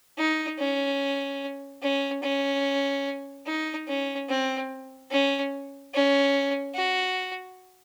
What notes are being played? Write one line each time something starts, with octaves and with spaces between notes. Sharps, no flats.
D#4
C#4
C#4
C#4
D#4
C#4
C4
C#4
C#4
F#4